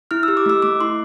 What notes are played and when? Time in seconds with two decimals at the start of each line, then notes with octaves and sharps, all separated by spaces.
0.11 E4 F6
0.23 E6
0.28 G4
0.37 D6
0.46 A3 E6
0.62 A3 D6
0.81 E4 C6